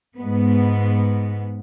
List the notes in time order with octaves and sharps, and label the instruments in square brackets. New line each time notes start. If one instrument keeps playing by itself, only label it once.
[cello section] G#2 G#3 B3